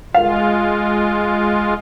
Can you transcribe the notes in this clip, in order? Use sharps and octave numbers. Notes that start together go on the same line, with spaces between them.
G#3 F4 F5